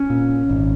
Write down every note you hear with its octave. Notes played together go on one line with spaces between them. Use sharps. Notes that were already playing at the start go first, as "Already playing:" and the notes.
Already playing: C#4
A#2
G#1